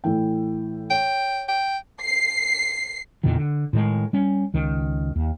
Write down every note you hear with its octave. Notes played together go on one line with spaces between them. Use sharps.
A2 E3 G5
C#5 G5
G5
C7
E2 A#2 D3 D#3
D3
A2 D#3 G#3
G3 C#4
C#2 D#3
D#2